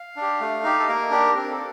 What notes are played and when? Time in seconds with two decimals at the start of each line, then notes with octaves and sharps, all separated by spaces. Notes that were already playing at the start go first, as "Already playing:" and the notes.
Already playing: F5
0.16 D4
0.22 G4
0.41 A3
0.63 D#4 G4
0.79 A4
0.88 A#3 A#4
1.11 D4 G4
1.35 C4 A#4
1.50 A4